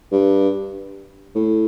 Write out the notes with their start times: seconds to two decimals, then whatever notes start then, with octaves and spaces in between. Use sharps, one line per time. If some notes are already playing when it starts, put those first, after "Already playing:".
0.11 G2
1.35 A2